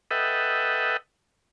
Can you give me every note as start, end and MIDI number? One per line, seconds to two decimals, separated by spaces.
0.11 0.97 69
0.11 0.97 71
0.11 0.97 75
0.11 0.97 76
0.11 0.97 78
0.11 0.97 79